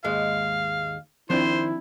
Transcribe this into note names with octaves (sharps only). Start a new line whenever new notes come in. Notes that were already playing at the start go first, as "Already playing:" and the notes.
D#2 G#2 G#3 F5
D#3 F3 C4 D4 E4 C5